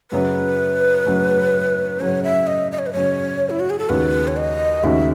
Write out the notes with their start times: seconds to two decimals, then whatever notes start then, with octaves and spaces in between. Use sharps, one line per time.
0.11 F#2 C#3 F#3 C#4 B4
1.06 F#2 C#3 F#3 C#4
2.00 F#2 C#3 F#3 C#4 C#5
2.24 E5
2.47 D#5
2.72 D#5
2.79 C#5
2.86 B4
2.93 F#2 C#3 F#3 C#4 C#5
3.50 E4
3.60 F#4
3.70 G#4
3.79 A4
3.89 D#2 C#3 G#3 D#4 F#4 B4
4.28 C#5
4.37 D#5
4.83 D#2 C#3 G#3 D#4 F#4 E5